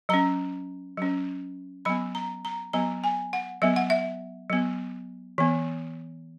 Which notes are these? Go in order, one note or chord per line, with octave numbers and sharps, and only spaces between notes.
F#3 C#4 A#5
F#3 C#4
F#3 B3 B5
A#5
A#5
F#3 B3 A#5
G#5
F#5
F#3 B3 E5
F#5
E5
F#3 B3
E3 B3